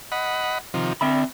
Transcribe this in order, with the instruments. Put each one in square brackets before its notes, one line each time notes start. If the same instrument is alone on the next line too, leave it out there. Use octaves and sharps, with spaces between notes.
[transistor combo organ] D#5 F#5 B5
C3 D#3 F3
[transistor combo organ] D3 [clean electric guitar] C4 E5 B5